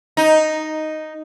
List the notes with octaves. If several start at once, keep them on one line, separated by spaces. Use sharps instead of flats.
D#4